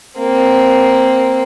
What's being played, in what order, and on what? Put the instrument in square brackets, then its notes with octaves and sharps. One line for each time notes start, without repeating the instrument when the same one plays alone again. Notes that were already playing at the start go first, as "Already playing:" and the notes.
[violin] A#3 C4